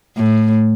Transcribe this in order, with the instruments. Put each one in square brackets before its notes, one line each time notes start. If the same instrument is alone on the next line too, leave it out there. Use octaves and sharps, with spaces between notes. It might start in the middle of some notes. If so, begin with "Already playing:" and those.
[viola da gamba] A2